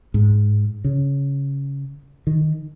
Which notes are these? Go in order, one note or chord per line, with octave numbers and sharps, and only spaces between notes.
G#2
C#3
D#3